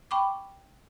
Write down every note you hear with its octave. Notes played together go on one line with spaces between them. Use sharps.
G5 B5 C#6 D6